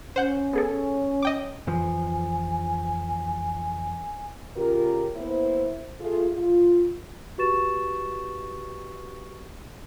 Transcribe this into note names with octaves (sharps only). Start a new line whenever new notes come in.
C#4 C5 F#5 G6
B3 G#4 A4
D#5 G5 D6
F2 E3 F3 G#5
C#3 F4 G4 A#4
A#3 B3 E4 C5
A3 F4 G#4
F4
F#4 G4 B4 C#6 A6 E7